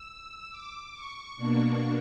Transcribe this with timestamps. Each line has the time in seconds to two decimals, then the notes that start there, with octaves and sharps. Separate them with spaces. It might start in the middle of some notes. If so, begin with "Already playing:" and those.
Already playing: E6
0.51 D6
0.93 C#6
1.37 B2 A#3 D4